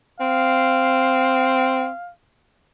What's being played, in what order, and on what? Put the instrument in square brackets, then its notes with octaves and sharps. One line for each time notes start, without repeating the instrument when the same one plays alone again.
[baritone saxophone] C4 [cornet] F5